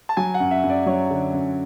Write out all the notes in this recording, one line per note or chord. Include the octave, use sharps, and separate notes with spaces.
A5
F#3 G#5
F#5
F#2
E5
F#2
D5
F#3 C#5
D3
F#2